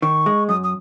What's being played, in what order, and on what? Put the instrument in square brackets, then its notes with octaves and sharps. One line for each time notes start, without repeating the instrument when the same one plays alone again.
[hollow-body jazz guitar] D#3 [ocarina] C#6
[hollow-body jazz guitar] G#3
[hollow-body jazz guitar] F#2 [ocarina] D#6
[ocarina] D#6